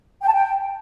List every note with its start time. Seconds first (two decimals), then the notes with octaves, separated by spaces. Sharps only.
0.22 G5
0.28 A5
0.33 G5